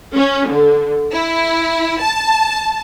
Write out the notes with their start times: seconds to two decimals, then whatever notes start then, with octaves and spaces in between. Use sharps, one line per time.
0.15 C#4
0.48 D3
1.14 E4
2.01 A5